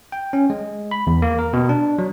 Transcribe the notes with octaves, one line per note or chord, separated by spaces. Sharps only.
G5
C#4
G#3
B5
E2
A#3
A#4
B2
D4
F#3